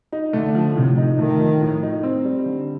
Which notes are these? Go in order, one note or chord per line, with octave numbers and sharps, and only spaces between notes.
D#4
D3 A3
F3
A2 C3
D#4
D#3 A3
F3
A2
D#4
C4
G3
D3